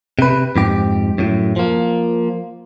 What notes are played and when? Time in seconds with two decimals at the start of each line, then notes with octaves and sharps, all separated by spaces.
0.19 C3 B4
0.56 F2 G#2 G4
1.18 F#2 A2
1.56 F3 A#3